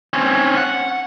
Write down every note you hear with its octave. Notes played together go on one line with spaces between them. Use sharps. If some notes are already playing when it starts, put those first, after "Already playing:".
C4 C#4
F#5